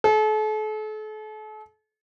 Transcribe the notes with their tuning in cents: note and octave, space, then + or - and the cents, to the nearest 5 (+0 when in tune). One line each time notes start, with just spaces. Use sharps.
A4 -40